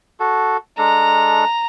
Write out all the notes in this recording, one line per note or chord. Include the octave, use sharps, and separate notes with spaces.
F#4 A4
G#3 D4 A4 A#5